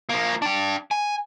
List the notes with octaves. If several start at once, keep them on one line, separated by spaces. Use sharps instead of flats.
F3 A#3
D4 G5
G#5